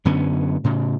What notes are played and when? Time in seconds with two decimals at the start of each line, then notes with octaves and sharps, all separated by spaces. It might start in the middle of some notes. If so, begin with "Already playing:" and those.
0.05 F#2 D3 B3 C#4
0.64 A2 C#3